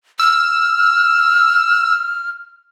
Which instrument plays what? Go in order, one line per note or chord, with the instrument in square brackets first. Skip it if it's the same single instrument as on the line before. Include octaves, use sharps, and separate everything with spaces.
[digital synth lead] E6 [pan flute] F6